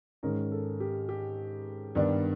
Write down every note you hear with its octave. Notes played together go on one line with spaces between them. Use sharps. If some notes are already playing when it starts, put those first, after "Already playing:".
G#2 D#3 G#3 C#4 A#4
A4
G4
G4
G2 D#3 G3 B3 D4